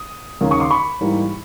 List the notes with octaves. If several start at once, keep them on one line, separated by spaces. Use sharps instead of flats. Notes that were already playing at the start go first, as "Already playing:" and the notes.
Already playing: D#6
D#2 C#3 F#3 A#3
C#6 D#6
C6 D6
B5 C#6
G#2 E3 G3 A#3